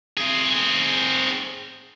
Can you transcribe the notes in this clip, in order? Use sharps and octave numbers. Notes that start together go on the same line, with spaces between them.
C4 G#4